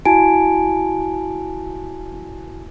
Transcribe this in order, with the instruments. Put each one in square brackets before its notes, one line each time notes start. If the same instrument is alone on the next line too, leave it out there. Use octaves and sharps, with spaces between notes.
[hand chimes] E4 F#4 G#5 A5 D7